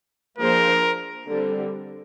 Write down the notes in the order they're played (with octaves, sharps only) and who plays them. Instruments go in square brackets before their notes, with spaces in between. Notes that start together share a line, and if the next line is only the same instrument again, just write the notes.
[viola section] F3 A#3 D4 G#4 C5 [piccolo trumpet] A#4
[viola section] D3 G3 C4